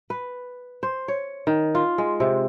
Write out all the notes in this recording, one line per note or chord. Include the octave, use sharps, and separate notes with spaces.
B4
C5
C#5
D#3
F4
G#3
C3